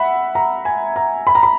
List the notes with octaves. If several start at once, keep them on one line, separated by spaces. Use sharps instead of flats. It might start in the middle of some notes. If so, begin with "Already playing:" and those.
Already playing: E5 F#5 B5
A#5
G#5
A#5
B5
A#5
B5